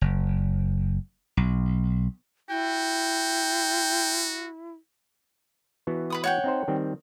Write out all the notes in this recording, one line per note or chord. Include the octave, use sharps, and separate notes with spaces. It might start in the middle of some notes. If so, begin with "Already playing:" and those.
F#1
B1
E4 F#4 G5
E3 B3 F#4
B4 B5 D#6
C#5 F#5 G5
C4 D#4 C5
D#3 G3 C4